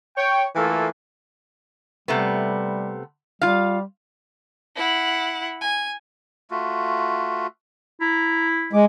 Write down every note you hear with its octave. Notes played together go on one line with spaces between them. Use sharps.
C#5 G5
E3 A3 A#3 F4 A4
C3 G3 A3 B3
G3 F4 F5
E4 F#5
G#5
A3 F4 F#4
E4 A#5
G#3 D6